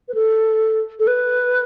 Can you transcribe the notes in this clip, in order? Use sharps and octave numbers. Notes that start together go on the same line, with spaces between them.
B4
A4
A4
B4